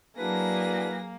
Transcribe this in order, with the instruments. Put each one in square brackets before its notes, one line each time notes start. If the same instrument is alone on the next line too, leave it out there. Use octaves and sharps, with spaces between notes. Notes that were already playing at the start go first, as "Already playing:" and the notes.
[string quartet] F#3 G#4 A#6 [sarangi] A#3 [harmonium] D4 [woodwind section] E4 F#4 B4